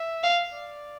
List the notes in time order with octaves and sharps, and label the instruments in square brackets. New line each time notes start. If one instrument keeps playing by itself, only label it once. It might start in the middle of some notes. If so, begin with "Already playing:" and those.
Already playing: [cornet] E5
[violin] F5
[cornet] D5